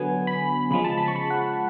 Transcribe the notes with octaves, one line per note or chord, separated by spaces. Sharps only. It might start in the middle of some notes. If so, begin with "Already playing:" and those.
Already playing: D3 F#3 B3 G#5
B5
C#3 F3 G#3 B5
A5
B5
C#6
B5
F#5